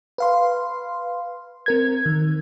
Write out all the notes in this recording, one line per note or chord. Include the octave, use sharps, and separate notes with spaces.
B4 F5 C6
C4 A#4 G#6
D#3